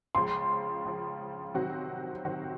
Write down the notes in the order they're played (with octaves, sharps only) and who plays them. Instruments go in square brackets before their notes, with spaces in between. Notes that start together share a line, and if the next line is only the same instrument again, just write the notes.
[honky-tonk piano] C#2 C#3 F3 [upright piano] C6
[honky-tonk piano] C#2 C#3 F3
C3 D#3 F#3 C4 F#4
C3 D#3 F#3 C4 F#4